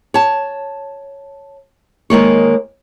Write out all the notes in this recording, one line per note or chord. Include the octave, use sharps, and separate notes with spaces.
C#5 A5
D#3 G#3 A#3 C#5